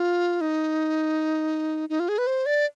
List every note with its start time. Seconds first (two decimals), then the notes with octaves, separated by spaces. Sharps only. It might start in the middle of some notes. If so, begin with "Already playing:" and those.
Already playing: F4
0.41 D#4
1.89 D#4
2.00 F4
2.09 G#4
2.18 B4
2.27 C5
2.46 D5